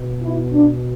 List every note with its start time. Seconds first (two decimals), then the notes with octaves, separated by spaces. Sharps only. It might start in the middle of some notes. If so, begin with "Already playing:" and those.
Already playing: B2
0.22 E4
0.52 D4